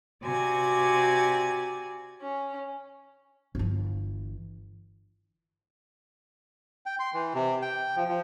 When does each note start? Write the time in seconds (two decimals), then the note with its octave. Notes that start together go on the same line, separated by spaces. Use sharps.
0.23 C3 F#4 D5 G#5 G#6
2.21 C#4
3.55 G1 E3
6.86 G5
6.99 C6
7.14 E3
7.35 C3
7.62 G5
7.96 F3
8.08 F3